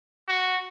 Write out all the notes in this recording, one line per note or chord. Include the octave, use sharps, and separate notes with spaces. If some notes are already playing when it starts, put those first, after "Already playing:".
F#4